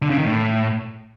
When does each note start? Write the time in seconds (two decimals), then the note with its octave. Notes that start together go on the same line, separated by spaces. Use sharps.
0.02 D3
0.10 C#3
0.18 D#3
0.26 A2